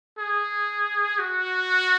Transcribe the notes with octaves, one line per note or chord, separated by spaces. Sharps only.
G#4
F#4